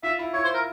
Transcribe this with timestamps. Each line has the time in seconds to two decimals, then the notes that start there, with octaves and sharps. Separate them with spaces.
0.03 F4 E5
0.19 E4
0.34 E4 C#5
0.44 C5
0.54 A#4